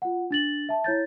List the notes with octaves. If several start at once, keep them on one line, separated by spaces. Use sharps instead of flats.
F4 F#5
D4 A6 F#7
E5 A5
E4 C#5 G6 A6